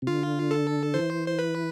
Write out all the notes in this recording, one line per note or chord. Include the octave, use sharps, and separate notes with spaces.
C3
D3 F4
A4
E3 C5
C5
B4